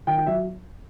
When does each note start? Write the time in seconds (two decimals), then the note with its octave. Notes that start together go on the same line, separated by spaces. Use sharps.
0.07 D#3 G5
0.17 G5
0.26 F#3 E5